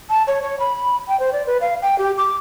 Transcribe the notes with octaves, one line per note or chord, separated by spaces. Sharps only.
A5
C#5
C#5
B5
G5
C5
D5
B4
F5
G5
G4
D6